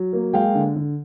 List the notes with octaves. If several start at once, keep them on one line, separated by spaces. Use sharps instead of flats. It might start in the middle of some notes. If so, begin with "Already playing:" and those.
Already playing: F#3
A#3
G#3 F5 G5
D3
D3